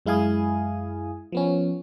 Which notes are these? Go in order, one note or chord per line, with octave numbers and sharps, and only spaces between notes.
F#2 G#3 E4 F5 G#5 D#6
F3 B3 C#4